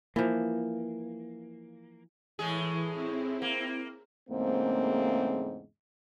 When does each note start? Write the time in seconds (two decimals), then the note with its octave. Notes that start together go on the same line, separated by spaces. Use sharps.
0.16 E3 F3 A#3
2.39 A2 E3 G#3 G#4
2.90 C4 E4
3.42 A#3
4.30 E2 G#2 C#3 A3 A#3 C4